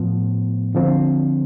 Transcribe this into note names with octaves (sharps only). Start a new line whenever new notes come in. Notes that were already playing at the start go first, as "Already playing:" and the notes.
Already playing: A2 F3 B3
D3 F3 C4